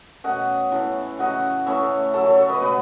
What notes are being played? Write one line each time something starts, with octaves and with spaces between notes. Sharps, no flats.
B2 A3 C#4 D#5 F#5
A2 E3 A3 C#4
C#3 F#3 A3 D#5 F#5
E3 A3 C#4 C#5 E5
C#3 F#3 C#4 A4 C#5
A4 C#5
A4 C#5
B4 D#5
B2 G#3 B3 B4 D#5